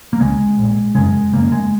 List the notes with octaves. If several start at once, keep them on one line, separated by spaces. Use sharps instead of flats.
A#3
C#2 C#3 G#3
A#1 A#2
F#1 F#2 C#3 G#3
F#1 F#2 C#3 A#3
G#3